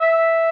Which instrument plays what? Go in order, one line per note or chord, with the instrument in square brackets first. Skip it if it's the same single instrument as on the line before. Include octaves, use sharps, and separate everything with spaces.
[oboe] E5